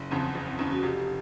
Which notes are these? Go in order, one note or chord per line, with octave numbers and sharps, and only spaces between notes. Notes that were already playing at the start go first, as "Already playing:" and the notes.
Already playing: F#1
E2 C#3 F3 C4
F#1
C4
E2 C#3 F3 C#4
F#4
F1 G4